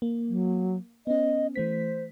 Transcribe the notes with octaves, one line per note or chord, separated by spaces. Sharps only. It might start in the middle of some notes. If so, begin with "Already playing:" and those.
A#3
F#3
B3 C#4 D#5
E3 A3 C5 B6